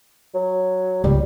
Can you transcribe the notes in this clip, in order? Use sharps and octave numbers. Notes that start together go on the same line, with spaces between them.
F#3
C#2 G3